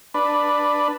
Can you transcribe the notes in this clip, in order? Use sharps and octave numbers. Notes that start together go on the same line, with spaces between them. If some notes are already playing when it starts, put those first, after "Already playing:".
D4 B4